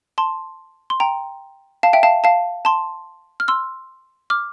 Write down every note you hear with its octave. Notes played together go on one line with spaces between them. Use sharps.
A5 C6
C6
G5 A#5
F5 A5
E5 G5
F5 A5
F5 A5
A5 C6
F6
C6 E6
D6 F6